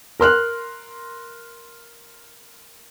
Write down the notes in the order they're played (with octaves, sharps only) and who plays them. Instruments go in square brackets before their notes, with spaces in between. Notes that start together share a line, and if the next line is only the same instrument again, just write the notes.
[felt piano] A#4 C6 F6 F#6